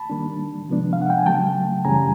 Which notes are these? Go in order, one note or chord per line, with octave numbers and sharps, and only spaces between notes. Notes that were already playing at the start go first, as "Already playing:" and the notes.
Already playing: A5 B5
D#3 G3 A#3 D4
C3 F3 G#3 B3 D4
F5
F#5
G5
G#5
C#3 F#3 A3 G5 A5
F#2 C#3 E3 G3 G#5 A#5